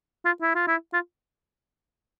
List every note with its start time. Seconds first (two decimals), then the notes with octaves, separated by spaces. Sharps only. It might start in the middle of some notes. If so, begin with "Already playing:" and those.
0.25 F4
0.42 E4
0.55 F4
0.67 E4
0.94 F4